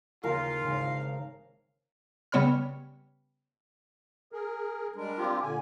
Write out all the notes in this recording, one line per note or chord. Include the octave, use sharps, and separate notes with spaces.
D#2 C#3 F4 G4 A#4 F5
G#1 C#3
C#3 G3 B3 C#5 B5 F6
G#4 A#4
G3 G#3 D4 A#4
C4 F4 G4
A#2 D3 G#5